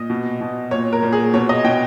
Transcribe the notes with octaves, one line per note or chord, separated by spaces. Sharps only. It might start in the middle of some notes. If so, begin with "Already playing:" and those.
Already playing: A#2 D#5
B2
B2
A#2 C#5
A#4
A#2
G#4
B2 C#5
D#5
B2 G5